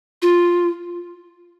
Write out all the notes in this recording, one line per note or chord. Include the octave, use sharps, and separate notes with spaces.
F4